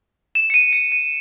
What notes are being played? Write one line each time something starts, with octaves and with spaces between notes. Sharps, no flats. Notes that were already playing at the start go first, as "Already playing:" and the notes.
E7
C#7
D#7
C#7
D#7